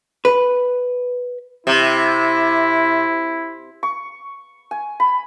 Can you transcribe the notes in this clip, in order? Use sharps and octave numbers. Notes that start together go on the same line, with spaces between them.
B4
C3 E4
C#6
G#5
B5